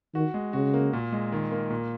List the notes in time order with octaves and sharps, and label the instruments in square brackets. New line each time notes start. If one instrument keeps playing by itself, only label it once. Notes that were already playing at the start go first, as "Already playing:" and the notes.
[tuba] D#3 [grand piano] F#4
[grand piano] G#3
[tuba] C#3 [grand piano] F#4
[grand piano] A#3
A#2
G#3
D#3
A#3
A#2